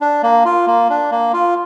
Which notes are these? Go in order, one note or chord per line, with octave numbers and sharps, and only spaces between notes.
D4
A#3
F4
A#3
D4
A#3
F4